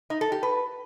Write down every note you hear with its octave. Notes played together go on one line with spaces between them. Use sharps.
D#4
A4
G4
B4